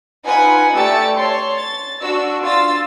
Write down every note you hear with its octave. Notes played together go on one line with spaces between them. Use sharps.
D#4 F4 B4 F#5 G#5
A3 G4 D5 E6 A6 C#7
C#5 A5 C6
A6
D4 F#4 E6
F4 E6 A6